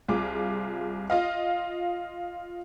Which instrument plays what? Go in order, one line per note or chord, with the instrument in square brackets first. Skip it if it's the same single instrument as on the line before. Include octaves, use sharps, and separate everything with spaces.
[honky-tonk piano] C2 F4 G#4 D6
F4 D#5 F5